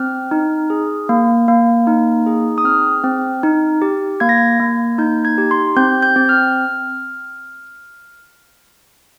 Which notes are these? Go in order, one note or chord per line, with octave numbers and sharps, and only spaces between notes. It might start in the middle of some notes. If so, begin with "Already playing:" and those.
Already playing: C4 F6
D#4
G#4
A#3
A#3
D#4
G#4
D#6
C4 F6
C4
D#4
G4
A#3 G#6
A#6
G#6
A#3
D#4 G6
G#6
G4
C6
C4 G6
G6
C4
F6